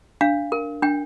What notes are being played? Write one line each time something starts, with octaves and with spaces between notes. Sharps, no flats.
D4 F5
A#4
D4 G5